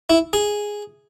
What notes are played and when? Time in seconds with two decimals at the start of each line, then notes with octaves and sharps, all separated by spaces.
0.10 E4
0.33 G#4